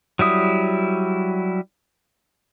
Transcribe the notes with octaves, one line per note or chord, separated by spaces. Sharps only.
F#3 G3 E4 D#6